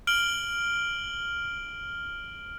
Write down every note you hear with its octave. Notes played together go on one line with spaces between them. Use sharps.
F6 D7 F#7 G7